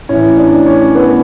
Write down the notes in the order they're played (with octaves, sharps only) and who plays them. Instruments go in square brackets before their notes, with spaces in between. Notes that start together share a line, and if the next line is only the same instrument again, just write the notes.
[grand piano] A2 E3 C#4 C#5
D4 D5
C#4 C#5
B3 B4